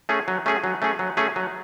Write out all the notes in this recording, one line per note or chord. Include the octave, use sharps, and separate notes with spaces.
A3 C#4 G#4
F#3
A3 C#4 G#4
F#3
A3 C#4 G#4
F#3
A3 C#4 G#4
F#3